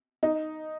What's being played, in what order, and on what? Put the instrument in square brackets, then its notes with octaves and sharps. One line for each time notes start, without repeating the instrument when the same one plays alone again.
[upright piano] D#4